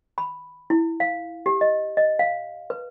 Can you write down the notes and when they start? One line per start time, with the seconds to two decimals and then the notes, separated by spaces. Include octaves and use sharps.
0.18 B5
0.70 E4
1.00 F5
1.46 G4
1.61 D#5
1.97 D#5
2.19 F5
2.70 B4